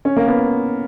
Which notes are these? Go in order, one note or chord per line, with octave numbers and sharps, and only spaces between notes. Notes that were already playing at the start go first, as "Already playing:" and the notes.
C#4
A#3
B3